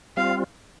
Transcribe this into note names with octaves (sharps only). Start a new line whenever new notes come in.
G3 C4 F4 F5